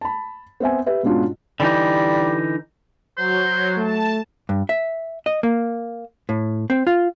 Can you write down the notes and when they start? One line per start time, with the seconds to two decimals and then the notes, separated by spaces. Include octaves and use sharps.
0.01 A5 B5
0.60 B3 C4 E5 G#5
0.86 G4 B4 E5
1.03 G#2 B2 C#4 D4 F4 F#4
1.60 D3 E3 G3 D#4
3.17 F#3 C5
3.77 A3 A5
4.49 G2
4.69 E5
5.26 D#5
5.43 A#3
6.29 A2
6.70 C4
6.87 F4